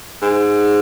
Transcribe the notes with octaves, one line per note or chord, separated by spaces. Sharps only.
G#2